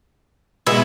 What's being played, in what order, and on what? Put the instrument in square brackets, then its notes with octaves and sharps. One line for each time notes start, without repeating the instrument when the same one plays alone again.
[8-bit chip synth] B2 G#3 B3 [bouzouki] E4